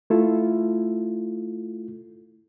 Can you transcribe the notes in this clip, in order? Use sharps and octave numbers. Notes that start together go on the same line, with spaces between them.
A3 E4 F4 A4